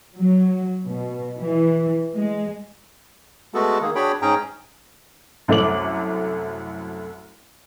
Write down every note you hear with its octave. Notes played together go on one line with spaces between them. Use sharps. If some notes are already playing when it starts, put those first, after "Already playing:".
F#3
B2
E3
G#3
G#3 A3 B3 F#4 A4
D#3 A#3 G#4
D4 F#4 G#4 C#5 G5 B5
G#2 C#4 G#4 G5 A#5
C2 F#2 A3 D6 F#7